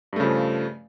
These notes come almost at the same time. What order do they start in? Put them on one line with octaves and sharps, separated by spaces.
G2 A3 C#3 F3